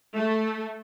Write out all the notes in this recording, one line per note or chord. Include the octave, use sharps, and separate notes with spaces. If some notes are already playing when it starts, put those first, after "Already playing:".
A3